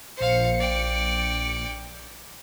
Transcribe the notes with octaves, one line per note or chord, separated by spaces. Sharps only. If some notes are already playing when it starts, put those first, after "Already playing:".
A#1 C5 F5 C#7
D5 G5